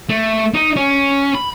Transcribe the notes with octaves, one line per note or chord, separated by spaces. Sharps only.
A3
D#4
C#4
B5